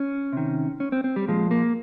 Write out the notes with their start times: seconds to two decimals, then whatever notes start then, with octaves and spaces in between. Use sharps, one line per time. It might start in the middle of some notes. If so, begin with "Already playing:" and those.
Already playing: C#4
0.33 C3 D#3
0.80 C#4
0.92 C4
1.04 C4
1.16 G3
1.27 A#2 F3 G#3
1.51 A#3